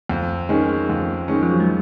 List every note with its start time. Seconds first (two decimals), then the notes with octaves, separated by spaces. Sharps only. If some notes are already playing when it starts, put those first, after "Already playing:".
0.09 F2
0.49 D#3 G#3 C#4
0.90 F2
1.28 D#3 G#3 C#4
1.43 F3
1.51 F#3
1.60 G#3